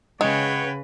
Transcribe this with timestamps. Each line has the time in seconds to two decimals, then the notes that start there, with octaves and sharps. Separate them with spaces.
0.21 C#3 G#3 B4 C#5 F#5 G5